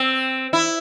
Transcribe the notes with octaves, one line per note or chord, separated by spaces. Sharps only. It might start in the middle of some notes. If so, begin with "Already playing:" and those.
Already playing: C4
E4